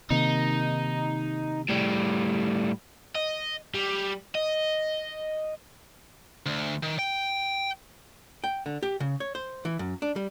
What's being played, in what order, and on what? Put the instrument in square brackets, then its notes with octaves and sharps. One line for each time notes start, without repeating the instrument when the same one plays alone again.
[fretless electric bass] C3 D#3 A#3 [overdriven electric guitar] D#4
[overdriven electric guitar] A2 G3
D#5
G3
D#5
[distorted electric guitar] D2
D#3
G5
[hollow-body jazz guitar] G5
D3
G4
C#3
C#5
C5
E3
F#2
D4
G3